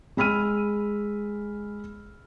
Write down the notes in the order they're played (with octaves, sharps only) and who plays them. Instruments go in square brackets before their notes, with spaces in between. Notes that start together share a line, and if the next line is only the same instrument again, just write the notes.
[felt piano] G#3 B5 E6 F6 D#7